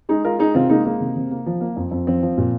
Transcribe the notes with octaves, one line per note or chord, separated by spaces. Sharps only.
G#3 D#4 G#4
G#3 F4 A#4
G#3 D#4 G#4
C3 C4 F4
G#3 A#3 D#4
G#3 A#3
C3
C3
A#3
F3
A#3
F2
F2
F3 C4
F3
A#2